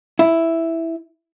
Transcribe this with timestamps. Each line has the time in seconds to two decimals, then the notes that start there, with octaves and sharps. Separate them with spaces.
0.19 E4